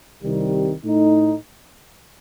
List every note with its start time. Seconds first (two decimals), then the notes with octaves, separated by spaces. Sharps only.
0.22 C2 C3 D#3 G3
0.84 A2 A3 D#4